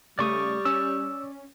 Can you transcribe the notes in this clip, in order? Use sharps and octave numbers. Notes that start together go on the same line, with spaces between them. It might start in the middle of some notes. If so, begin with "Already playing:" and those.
C#3 G3 A3 D5 C#6 D#6
C#4 E6